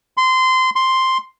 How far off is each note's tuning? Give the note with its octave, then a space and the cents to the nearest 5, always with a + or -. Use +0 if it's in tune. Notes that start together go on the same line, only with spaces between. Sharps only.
C6 -20
C6 +0